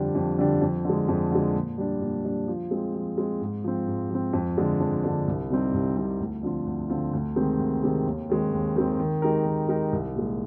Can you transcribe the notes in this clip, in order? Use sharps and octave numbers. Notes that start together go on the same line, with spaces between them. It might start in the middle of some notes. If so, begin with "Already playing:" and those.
Already playing: F2 D3 G3 D4 G4
F2
D3 G3 D4 G4
F2
D3 G#3
F2
D3 G#3
A#2
G3 D4
A#2
G3 D4
F3
G#3 C4
F3
G#3 C4
G#2
F3 C4
G#2
F3 C4
F2
D3 G#3 D4
F2
D3 G#3 D4
C2
C3 G3 C4 D#4
C2
C3 G3 C4 D#4
D2
D3 F3 C4 F4
D2
D3 F3 C4 F4
D2
C3 D#3 G#3 C4
D2
C3 D#3 G#3 C4
D#2
D#3 G#3 C4
D#2
D#3 G#3 C4
D#3
G#3 D#4 G4 A#4
D#3
G#3 D#4 G4 A#4
C2
A#2 G#3